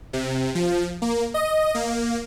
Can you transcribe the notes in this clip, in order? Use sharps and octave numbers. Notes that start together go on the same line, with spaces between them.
C3
F3
A#3
D#5
A#3